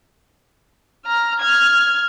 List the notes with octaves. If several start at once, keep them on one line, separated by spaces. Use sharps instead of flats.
A#5 F6
F6 G#6